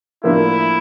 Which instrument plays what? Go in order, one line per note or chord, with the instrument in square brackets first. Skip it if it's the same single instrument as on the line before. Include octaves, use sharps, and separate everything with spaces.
[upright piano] A2 F3 A#3 D4 [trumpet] E4